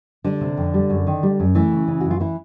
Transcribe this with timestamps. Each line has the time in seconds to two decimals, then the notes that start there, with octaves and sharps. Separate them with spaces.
0.24 D3 G3 D4
0.41 C3
0.57 F2
0.74 G3
0.90 F#2
1.07 D#3
1.23 G3
1.40 F#2
1.55 E3 A3 E4
1.72 C#3
1.88 C#3
2.01 F#2 F#4
2.11 F4
2.20 E3 E4